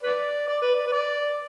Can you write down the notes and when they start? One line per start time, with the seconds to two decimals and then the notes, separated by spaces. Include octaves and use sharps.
0.03 B4 D5
0.48 D5
0.62 B4
0.75 D5
0.87 B4
0.92 D5